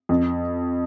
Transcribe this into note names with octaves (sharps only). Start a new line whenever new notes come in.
F2